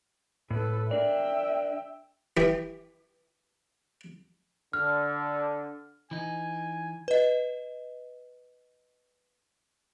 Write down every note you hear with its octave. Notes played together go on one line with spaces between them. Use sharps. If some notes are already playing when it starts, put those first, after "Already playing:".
A2 A4 B4
D4 A#4 D5 E5 G5
E3 G4
D3 F6
E3 D#4 G#5
B4 D#5